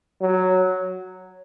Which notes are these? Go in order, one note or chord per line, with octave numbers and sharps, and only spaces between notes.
F#3